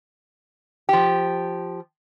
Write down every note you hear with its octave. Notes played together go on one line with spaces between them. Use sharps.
F3 G4